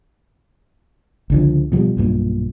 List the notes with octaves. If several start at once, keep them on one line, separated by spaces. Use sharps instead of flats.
C#2 D3 F3
B2 F3 G3
B1 G2 A#2